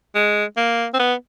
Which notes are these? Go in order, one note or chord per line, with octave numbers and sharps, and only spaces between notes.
G#3
A#3
C4
B3